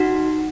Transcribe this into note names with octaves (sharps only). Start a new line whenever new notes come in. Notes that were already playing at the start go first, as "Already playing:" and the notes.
Already playing: D#4 F#4